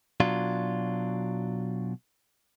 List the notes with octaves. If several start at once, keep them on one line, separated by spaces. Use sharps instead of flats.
B2 F#3 D4 F4